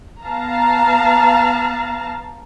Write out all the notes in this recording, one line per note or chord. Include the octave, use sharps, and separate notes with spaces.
B3 F5 A5 A#5